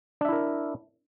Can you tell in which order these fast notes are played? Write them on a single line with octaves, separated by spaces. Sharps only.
D4 E5 E4 A#4